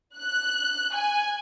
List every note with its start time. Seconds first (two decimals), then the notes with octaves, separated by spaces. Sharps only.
0.17 F#6
0.95 G#5